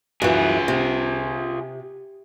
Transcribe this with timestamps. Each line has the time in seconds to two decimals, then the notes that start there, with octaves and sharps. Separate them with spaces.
0.22 F#2 E3 F4 G#4
0.68 C3